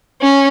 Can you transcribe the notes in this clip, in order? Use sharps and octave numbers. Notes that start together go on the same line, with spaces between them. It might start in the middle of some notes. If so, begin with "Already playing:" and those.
C#4